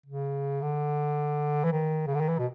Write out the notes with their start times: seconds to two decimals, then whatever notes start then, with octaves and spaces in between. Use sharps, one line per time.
0.06 C#3
0.62 D3
1.64 E3
1.72 D#3
2.07 C#3
2.15 D3
2.21 D#3
2.29 E3
2.39 B2